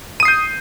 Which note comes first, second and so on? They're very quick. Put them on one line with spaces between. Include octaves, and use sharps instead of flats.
D#7 D#6 C7 G6